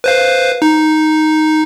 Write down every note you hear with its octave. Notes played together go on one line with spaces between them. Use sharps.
B4 C5 F5
D#4